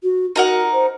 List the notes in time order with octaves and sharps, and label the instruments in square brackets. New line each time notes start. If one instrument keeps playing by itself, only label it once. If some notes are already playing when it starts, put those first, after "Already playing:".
[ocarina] F#4
[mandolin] D#4 A#4 F#5 [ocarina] F#4
[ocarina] C5